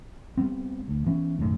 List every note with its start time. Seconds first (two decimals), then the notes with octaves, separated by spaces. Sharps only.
0.37 G3 A3 B3 C4
0.88 D2
1.06 E3 B3 C#4
1.39 B1 F#2 A2 D#3